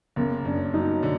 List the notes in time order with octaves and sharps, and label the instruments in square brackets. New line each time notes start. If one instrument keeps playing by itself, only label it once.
[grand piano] F#1 [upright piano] A#3
[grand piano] F#2 [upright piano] D4
[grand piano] F#3 [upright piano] D#4
[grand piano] D3